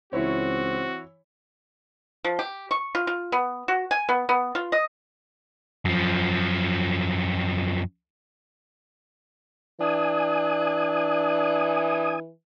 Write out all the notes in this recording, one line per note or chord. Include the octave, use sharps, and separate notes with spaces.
C#2 E3 C4 E4 F#4 C#5
F3
G4
C#6
F4
F4
B3
F#4
G#5
B3
B3
F4
D#5
F#2 F3
E3 D4 G#5 D#6